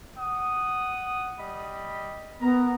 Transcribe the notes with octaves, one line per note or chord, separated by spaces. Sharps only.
F#5 D#6
G3 D#5 B5
B3 A#4 A#5